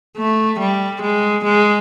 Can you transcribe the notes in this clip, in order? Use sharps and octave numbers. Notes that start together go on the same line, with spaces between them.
A3
G3
G#3
G#3